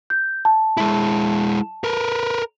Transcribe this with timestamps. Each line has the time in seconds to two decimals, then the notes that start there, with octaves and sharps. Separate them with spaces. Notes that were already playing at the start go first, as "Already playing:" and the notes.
0.10 G6
0.45 A5
0.77 G#3 E4
1.84 A#4 B4